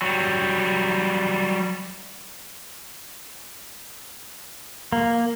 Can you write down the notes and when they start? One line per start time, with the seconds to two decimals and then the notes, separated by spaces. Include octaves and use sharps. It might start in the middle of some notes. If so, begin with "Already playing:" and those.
0.02 F#3 G3
4.92 A#3